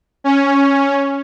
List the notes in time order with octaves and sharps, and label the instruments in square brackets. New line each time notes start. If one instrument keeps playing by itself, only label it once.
[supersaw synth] C#4